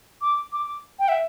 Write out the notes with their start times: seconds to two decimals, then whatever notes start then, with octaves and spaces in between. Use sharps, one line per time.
0.21 D6
0.53 D6
0.99 G5
1.08 E5